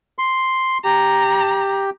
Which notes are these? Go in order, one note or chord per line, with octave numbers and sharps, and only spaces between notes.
C6
G4 A#5